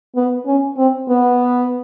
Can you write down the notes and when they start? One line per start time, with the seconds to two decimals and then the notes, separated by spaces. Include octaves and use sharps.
0.16 B3
0.46 C#4
0.77 C4
1.09 B3